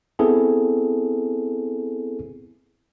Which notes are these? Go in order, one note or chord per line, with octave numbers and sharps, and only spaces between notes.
B3 C4 E4 G#4 A4